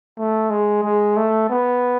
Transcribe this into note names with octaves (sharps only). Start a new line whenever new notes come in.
A3
G#3
G#3
A3
B3